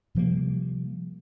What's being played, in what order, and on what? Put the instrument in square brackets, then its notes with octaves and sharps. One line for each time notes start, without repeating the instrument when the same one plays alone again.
[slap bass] C3 F3 G3 A#3